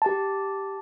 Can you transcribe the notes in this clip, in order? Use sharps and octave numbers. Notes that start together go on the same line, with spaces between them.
G4 A5